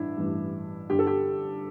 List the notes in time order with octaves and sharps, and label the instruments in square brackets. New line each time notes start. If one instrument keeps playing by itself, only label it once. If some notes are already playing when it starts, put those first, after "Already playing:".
Already playing: [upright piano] A1 G2 E3 D4 E4
A1 G2 E3
G1 G2 D3 G4
A4
G4